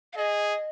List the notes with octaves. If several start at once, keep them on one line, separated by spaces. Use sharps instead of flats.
F5
G#4 D#5